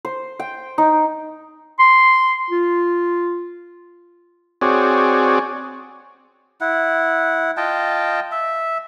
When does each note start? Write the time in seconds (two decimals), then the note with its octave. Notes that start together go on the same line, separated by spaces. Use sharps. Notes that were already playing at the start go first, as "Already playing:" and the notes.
0.05 C5
0.39 G5
0.78 D#4
1.79 C6
2.50 F4
4.61 C4 F#4 G#4 C#5 D5
6.61 E4 F#5
7.57 F4 D#5 G5 A5
8.32 E5